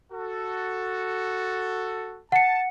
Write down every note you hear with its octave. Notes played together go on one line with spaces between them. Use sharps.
F#4 A4
F#5 A5 C#7